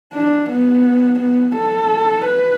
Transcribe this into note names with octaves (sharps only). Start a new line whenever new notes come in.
D4
B3
B3
A4
B4